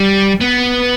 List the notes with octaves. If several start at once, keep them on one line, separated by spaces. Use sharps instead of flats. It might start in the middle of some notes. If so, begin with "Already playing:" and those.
Already playing: G3
B3